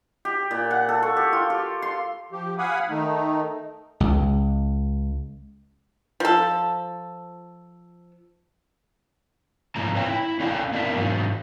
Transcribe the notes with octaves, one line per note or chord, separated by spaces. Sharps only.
G4
A#2
F#5
A4
C#6
G4
F4
G4
C6
F3 G4
F5 F#5 G#5 B5 D#6
D#3 A3 D#4
C#2
F3 A4
G#2 C#3 F3 A3 A#5
B4 C#5 G5
E4
C#4 D4 A4 C#5 F5 G5
B3 D4 E4 A#4 E5 F5
G#2 F#3